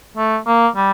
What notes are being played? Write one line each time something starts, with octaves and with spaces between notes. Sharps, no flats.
A3
A#3
G3